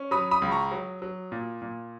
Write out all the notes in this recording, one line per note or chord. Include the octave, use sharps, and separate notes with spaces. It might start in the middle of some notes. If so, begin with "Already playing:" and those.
Already playing: C#4
F#3 B5 D#6
B5 D#6
C#2
A#5 C#6
F#3
F#3
A#2
A#2